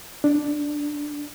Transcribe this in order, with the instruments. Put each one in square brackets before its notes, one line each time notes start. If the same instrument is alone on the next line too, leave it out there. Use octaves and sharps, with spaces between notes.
[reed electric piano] D4